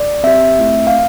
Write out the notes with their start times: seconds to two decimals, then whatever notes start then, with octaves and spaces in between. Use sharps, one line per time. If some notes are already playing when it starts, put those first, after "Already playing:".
Already playing: D5
0.23 C4 G4 E5
0.59 A3 C4 E4
0.87 F5